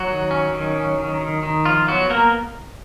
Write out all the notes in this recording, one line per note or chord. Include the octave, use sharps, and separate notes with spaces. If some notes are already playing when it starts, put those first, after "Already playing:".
Already playing: F#3 F#4
D#3
C#4
D#3
C#4
D#3
D#3
D#3
F3 F4
F#3 B3 F#4
A#3 B3 A#4